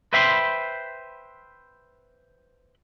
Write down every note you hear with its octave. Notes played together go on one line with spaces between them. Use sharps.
B4 C5 E5 G5 B5 C6